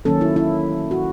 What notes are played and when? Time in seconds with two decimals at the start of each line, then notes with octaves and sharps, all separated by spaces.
0.05 D#3 F#3 A#3 C#4 A4
0.21 E4
0.36 E4
0.91 F#4